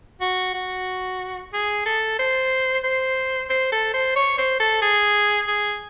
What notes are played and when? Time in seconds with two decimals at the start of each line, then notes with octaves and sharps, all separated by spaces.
0.21 F#4
0.54 F#4
1.53 G#4
1.86 A4
2.19 C5
2.84 C5
3.50 C5
3.72 A4
3.93 C5
4.16 C#5
4.38 C5
4.60 A4
4.82 G#4
5.47 G#4